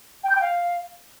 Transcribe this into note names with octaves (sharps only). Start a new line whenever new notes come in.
G5
G6
G5
F5